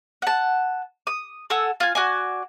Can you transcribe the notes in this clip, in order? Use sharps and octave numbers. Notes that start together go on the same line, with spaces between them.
F#5 A5
D#6
A4 F#5 G#5 E6
F4 G#5
F#4 D5 G#5